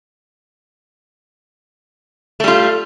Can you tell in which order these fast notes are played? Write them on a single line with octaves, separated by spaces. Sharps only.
A3 G3 F4